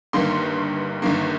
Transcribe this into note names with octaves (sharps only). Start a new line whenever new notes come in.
G1 G2 D#3 A#3 C6
G1 G2 D#3 A#3